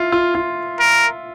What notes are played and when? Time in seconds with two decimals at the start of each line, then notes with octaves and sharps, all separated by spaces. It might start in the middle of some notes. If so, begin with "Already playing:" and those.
Already playing: E4 F4
0.12 F4
0.35 F4
0.80 A#4